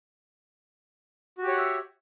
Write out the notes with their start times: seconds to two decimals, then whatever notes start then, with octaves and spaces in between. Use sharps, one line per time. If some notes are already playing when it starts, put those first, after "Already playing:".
1.38 F#4
1.43 G4
1.47 C#5
1.52 F#5
1.57 E5